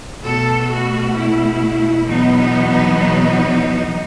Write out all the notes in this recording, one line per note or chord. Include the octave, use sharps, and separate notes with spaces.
B2 A3 A4
F#4
E4
E2 B2 F#3 B3 D#4
D#4
D#4
D#4